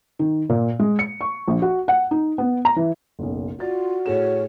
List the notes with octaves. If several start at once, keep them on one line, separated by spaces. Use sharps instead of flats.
D#3
A#2
G#3
C#7
C#6
A#1
F#4
F#5
D#4
B3
A#5
E3
F#1 B1
F4 F#4 D5 A6
A2 G#4 C#5 E7